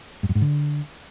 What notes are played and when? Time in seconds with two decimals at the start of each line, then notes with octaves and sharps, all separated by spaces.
0.23 G2
0.29 F#2
0.35 G#2
0.41 D3